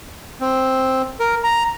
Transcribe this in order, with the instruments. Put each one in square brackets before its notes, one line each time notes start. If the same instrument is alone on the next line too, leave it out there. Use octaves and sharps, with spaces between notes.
[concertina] C4
A#4
A#5